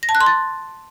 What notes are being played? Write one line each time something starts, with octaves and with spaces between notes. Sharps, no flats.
A#6
A5
F#6
C6
A6